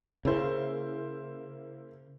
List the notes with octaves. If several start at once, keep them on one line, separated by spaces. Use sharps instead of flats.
C#3 A#3 E4 C5